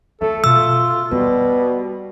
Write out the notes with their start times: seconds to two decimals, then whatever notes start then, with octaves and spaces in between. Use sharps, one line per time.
0.21 A3 F4 A4
0.44 B2 F4 E6
1.11 B2 G3 B3